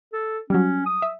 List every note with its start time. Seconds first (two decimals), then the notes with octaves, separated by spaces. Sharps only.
0.13 A4
0.50 F#3 G3 C#4
0.86 D#6
1.02 E5